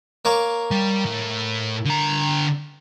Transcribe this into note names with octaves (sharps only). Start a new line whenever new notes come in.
A#3 C#5 D6
G3
A2
D3 A#5